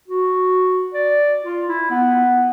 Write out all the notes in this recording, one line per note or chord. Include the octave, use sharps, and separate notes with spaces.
F#4
D5
F4
E4
B3